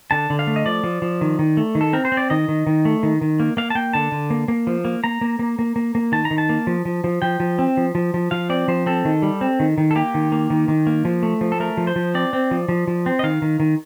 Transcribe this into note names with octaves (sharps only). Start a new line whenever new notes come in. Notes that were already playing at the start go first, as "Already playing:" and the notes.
D3 A5
D3
F5
A3
D#5
F3 D5
F3
F3
D#3
D#3
A3
D#3
A4
C4 A#4
C5
C4
D5
D#3 D#5
D#3
D#3
A3
D#3
D#3
A#3
A#3 F5
A5
A#3 G5
D3 A5
D3
A#3
A#3
F3
A#3
A#3 A#5
A#3
A#3
A#3
A#3
A#3
D#3 A5
A#5
D#3
A5
A#3
F3
F3
F3
F3 G5
F3
C4
F3
F3
F3
F3 F5
C4 D5
F3 C5
C4 A4
D#3
G3
C4
D#3
D#3
A4
A#3 G4
D#3
A#3
D#3
D#3
A#3
F3
A3
F3
A4
A3 A#4
F3
C5
F3
C4 D5
C4
F3
F3
F3
C4
D#5
D#3 F5
D#3
D#3